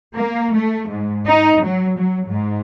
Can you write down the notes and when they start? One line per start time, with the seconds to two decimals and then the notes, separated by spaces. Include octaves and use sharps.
0.15 A#3
0.55 A3
0.89 G#2
1.27 D#4
1.64 F#3
1.98 F#3
2.28 G#2